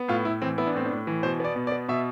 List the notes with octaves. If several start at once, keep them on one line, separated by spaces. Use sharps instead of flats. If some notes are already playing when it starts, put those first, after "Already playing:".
Already playing: B3
A2 F4
A2 E4
E3 C4
B3 E4
D4
A2 C4
D4
A2
E3
B2 C5
B3 D5
B2
D5
B3
B2 E5